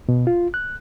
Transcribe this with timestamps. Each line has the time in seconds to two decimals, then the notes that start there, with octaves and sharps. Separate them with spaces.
0.09 B2
0.27 F4
0.54 F#6